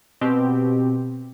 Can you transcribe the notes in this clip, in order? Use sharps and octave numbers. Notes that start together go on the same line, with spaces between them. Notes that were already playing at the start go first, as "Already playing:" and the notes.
B2 C4 G4